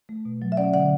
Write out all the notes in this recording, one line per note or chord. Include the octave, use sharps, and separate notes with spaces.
A3
B2
F#3
E5
C#4 D5 F#5
D3 D5 F#5